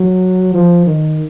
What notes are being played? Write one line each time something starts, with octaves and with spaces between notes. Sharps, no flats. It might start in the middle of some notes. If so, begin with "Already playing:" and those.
Already playing: F#3
F3
D#3